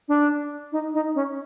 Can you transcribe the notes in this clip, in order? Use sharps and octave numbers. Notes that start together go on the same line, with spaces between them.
D4
D#4
D#4
C#4